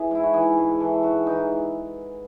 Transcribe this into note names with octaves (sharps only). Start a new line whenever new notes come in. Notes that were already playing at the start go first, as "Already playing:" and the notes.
Already playing: E3 G#4
G#2 E4
F#4
E3 G#4
G#2
E3 A4
G#2 F#4
E3 D#4